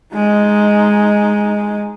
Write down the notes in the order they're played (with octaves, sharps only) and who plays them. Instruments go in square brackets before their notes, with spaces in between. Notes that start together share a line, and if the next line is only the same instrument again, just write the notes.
[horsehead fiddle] G#3 D#4